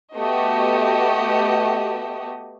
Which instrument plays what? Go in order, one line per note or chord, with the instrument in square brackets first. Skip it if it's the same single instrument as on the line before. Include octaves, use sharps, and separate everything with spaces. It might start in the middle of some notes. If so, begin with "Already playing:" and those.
[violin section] A3 B3 F#4 G4 D#5